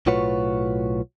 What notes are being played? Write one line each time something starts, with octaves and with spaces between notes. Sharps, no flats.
B1 A2 F4 F#4 B4 C#5